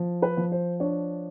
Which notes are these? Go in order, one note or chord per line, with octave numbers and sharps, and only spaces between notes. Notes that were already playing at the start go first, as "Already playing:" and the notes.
Already playing: F3
B4
F3
C5
D4 C#5